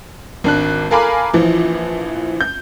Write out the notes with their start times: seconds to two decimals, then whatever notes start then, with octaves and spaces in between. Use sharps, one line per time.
0.44 G#1 D4 F#6
0.91 A4 A#4 F5 G#5 B5 D6
1.34 A#1 E3 F3
2.41 G6